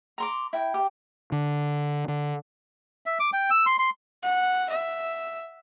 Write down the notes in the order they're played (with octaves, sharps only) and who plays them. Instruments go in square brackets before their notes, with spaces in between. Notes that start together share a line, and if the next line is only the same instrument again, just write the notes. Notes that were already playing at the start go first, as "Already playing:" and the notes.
[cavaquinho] A#5 C6 D6
E4 G5
G4
[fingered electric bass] D3
D3
[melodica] E5
D6
G5
E6
C6
C6
[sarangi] F#5
E5